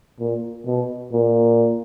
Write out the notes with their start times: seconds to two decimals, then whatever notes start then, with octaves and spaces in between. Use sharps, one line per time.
0.20 A#2
0.66 B2
1.12 A#2